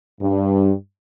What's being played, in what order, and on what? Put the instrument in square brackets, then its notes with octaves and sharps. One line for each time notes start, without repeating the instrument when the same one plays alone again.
[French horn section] G2